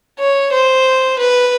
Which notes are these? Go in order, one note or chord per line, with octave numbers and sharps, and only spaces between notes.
C#5
C5
B4